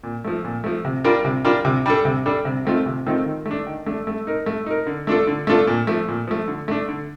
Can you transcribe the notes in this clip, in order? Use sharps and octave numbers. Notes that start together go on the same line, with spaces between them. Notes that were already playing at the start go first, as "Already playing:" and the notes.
A#2
F3 A3
A#2
F3 A3
C3
G3 D4 F4 A#4
C3
G3 D4 F4 A#4
C3
G3 D4 A4
C3
G3 D4 A4
C3
D#3 A3 C4 F4
C3
D#3 A3 C4 F4
D#3
A3
D4
D#3
A3 D4
A3
D#4 A#4
A3
D#4 A#4
D3
A3 D4 F4 A4
D3
A3 D4 F4 A4
A#2
F3 A3
A#2
F3 A3
D3
A3 D4
D3